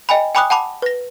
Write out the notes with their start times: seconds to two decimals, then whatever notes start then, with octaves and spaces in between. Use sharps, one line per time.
0.09 D#5 G5 G#5 B5
0.35 G5 G#5 B5 D6 D#6 F#6
0.50 F#5 A5 B5 D6
0.82 B4 A#6